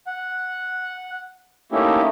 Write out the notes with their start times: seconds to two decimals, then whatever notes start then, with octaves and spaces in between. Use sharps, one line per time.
0.07 F#5
1.72 A3 A#3 C#4 D#4 E4 G4